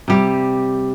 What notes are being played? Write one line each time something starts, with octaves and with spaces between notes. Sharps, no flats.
C3 G3 G4